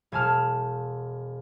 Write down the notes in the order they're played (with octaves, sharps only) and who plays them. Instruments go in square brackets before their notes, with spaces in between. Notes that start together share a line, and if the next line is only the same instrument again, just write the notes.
[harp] E1 G#5 A5 F6